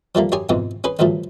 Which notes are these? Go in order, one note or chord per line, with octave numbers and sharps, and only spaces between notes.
F3 G3 A3 A#3
F#2 G4 C#5 G#5 D#6
F2 G#2 B2 E3
C#4 G#4 B4
D2 G2 F3 F#3 A3